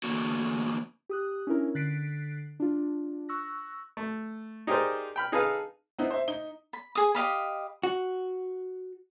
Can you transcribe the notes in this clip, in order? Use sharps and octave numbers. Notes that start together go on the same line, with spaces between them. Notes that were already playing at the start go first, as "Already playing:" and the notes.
E2 D3 E3 A#3 F#4
G4 D#6 F#6
C#4 D4 E4 A#4
D3 F#6 A6 B6 C7 D7
D4 F4
C#6 E6 F#6 A#6
A3
D#4 G4 G#4 A#4 C5 D5
G5 B5 F6
D#4 G#4 A4 B4 F5
B3 C4 D#4 E4
C5 E5
D#4 G7
B5
G#4 D#6
G4 D#5 F5 B5
F#4